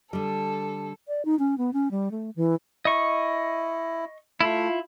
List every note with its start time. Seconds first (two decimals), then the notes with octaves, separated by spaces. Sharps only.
0.13 D3 G3 A4
1.08 D5
1.25 D#4
1.39 C#4
1.58 B3
1.73 C#4
1.91 G3
2.11 A3
2.36 E3
2.85 E4 D#5 C#6
4.41 A3 E4 F4